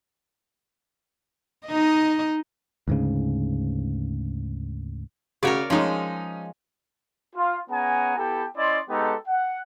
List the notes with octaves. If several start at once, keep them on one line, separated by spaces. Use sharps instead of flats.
D#4 D#5
D2 G#2 C#3
C#3 F#4 A#4 C#5 D5
F3 G#3 C#4 D#4
F4
B3 C#4 G#4 F#5 G#5 A#5
B3 E4 G4 A4 G5
C#4 E4 D5 D#5 C6
G#3 B3 D#4 G4 A4
F#5